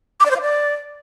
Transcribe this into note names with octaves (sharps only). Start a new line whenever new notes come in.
D6
D5
C5
F5
D5